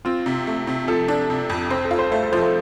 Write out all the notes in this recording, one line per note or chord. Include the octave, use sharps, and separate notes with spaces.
C4 F4
C3
A3
C3
F3 A4
D4
C3
F2
C4 C5
A4
F4
C5
A3 C5
A4
F3 C5
A4
C5